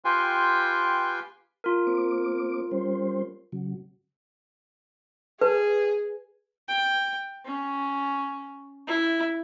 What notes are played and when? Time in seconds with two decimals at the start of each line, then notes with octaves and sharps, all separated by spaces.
0.05 F4 G4 B4 G5 G#5 C6
1.64 F4 A#4
1.87 A#3 C4 D6
2.71 G3 C#4 C5
3.52 C#3 F#3
5.41 G#4 B4
6.68 G5
7.45 C#4
8.87 E4